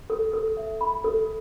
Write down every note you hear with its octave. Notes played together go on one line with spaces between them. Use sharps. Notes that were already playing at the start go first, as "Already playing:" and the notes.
A4
A4
E5
B5
A4